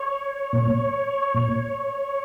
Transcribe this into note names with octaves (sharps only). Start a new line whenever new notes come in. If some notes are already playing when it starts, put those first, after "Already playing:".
Already playing: C#5
A#2
A#2